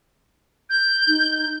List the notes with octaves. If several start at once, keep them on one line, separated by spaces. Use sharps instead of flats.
G6
D#4